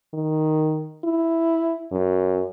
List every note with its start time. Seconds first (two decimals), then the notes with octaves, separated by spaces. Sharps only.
0.14 D#3
1.04 E4
1.92 F#2